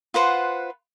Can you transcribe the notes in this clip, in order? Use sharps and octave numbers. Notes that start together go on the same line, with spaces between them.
F4 B4 C5 F#5